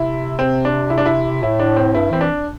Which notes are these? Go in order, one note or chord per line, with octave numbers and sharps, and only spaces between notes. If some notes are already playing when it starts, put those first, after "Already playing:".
Already playing: C3 E4
C4
D4
E4
D4
E4
A2 E4
D4
C4
G2 E4
E3 C4
D4